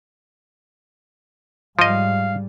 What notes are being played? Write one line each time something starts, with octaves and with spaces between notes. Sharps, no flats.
G#2 F3 G3 D#5 F5